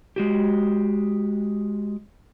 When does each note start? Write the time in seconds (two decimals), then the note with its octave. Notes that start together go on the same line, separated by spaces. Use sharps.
0.16 G#3 F#4 G4